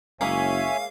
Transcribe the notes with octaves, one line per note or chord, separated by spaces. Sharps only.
F#1 G#3 A#3 C#4 C#5 E5 F5 G#5